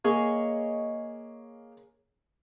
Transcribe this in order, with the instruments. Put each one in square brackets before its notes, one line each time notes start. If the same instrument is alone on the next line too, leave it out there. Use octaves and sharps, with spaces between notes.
[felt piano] A#3 [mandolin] G#4 C#5 D#5